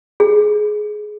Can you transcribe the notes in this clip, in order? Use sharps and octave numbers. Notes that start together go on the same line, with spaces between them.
G#4